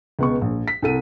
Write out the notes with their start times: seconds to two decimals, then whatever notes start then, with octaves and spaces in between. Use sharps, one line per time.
0.19 C#2 B2 C#6
0.41 A#1
0.68 B6
0.82 C2 A4 D#7